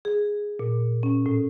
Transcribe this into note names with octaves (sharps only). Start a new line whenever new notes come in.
G#4
A#2
C#4
A2